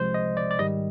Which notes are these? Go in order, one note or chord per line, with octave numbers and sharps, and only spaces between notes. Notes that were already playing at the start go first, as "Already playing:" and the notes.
Already playing: C2 C3 F3 G#3 C5
D#5
D5
D5
G#2 D#3 G3 D#5